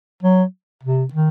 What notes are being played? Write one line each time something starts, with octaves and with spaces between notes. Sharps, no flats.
F#3
C3
D#3